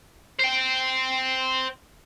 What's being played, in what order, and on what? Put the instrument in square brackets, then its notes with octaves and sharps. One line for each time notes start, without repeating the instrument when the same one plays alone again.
[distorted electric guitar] C5 G5